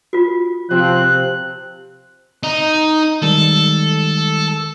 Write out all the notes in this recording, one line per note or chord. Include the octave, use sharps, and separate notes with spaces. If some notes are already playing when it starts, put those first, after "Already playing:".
F4 F#4
C3 F3 C4 F#6
D#4
D#3 G3 G#3 A4